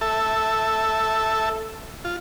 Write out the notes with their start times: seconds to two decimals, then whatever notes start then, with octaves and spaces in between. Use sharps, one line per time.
0.01 A4 E5
2.05 F4